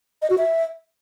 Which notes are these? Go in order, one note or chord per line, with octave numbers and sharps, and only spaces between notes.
D#5
F#4
E5